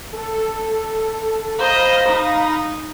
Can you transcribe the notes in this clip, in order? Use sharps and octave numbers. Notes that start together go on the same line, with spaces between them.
A4
C5 D#5 F5 A#5 B5
D#4